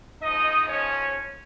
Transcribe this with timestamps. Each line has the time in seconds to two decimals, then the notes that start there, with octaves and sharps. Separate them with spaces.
0.21 G#2 F3 D#4 D#5
0.69 C#4 C#5